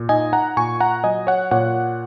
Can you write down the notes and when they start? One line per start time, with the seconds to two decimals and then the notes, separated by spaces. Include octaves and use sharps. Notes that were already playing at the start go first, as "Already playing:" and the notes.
Already playing: A#2
0.09 D#4 D#5 G#5
0.33 F#5 A#5
0.57 A#2 G#5 C#6
0.80 F#5 A#5
1.04 F#3 D#5 G#5
1.27 C#5 F#5
1.51 A#2 C#5 F#5